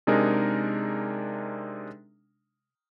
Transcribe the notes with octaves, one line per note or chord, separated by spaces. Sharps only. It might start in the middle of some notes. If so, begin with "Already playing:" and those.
C3 G#3 D4 D#4 G#4 A#4